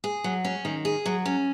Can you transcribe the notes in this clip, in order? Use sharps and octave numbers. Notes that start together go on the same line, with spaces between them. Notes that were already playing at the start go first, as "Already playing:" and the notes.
G#4
F#3
C#4
D#3
G#4
F#3
C#4